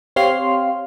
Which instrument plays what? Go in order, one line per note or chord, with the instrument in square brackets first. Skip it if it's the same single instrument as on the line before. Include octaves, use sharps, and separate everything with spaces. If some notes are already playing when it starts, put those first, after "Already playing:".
[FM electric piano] C4 G4 C#5 F5 C6 F6